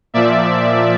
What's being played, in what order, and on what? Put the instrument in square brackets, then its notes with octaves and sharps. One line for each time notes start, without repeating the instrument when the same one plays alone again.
[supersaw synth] A#2 F3 D5 E5